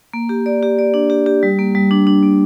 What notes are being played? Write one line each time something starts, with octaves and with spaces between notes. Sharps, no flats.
A#3
G4
D5
G4
D5
D4
G4
G4
G3
A#3
G3
D4
D4
A#3